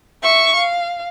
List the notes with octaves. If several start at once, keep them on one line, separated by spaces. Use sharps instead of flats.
E5 C#6
F5